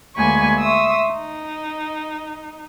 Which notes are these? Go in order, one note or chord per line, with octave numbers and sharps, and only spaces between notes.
D2 G#3 A#3 G#5 B5 C#6
E5 C6 C#6 D#6 E6
D#4